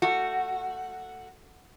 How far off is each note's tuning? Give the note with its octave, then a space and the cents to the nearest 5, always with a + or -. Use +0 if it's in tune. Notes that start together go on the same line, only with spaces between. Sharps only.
A3 +15 F#4 +0